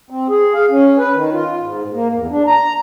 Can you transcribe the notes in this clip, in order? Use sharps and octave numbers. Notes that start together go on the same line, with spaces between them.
C4
G#4
F5
C#4
B4
D#3
F4
G#2
A#3
E2
D4
A#5